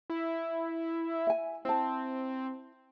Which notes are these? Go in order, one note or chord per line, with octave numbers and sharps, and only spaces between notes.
E4
E5 G#5
C4 E4 A5